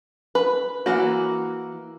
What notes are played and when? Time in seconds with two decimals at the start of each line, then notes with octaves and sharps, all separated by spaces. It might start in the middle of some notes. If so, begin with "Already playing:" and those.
0.35 B4
0.86 E3 A#3 F#4